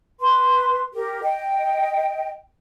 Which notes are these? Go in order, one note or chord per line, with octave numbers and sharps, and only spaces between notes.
B4 C6
G4 A#4
D#5 G5